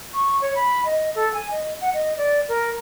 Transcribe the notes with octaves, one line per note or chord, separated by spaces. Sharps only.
C#6
C#5
B5
D#5
A4
G#5
D#5
F#5
D#5
D5
A#4